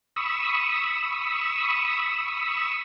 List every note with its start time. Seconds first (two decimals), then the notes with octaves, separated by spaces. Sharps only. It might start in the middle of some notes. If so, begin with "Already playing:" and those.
0.16 B5 C#6 D#6 E6